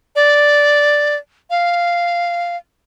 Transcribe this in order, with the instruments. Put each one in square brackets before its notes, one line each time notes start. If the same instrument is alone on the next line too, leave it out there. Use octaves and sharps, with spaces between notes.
[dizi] D5
F5